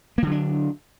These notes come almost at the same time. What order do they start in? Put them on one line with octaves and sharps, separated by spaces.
A#3 D3 F#3 D4